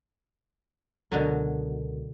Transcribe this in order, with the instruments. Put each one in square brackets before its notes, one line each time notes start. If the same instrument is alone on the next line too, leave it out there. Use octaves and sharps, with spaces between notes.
[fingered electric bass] C#2 [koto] B2 D3 F#3 [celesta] A4 A#4